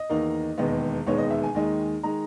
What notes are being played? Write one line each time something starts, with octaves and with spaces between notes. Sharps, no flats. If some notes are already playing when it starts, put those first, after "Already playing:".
Already playing: D#5
E2 D#3 A#3 D#4
E1 D#2 D#3 G#3 B3
E1 D#2 D#3 G#3 B3 C#5
D#5
E5
G#5
D#2 D#3 G#3 D#4
D#3 G#3 D#4 A#5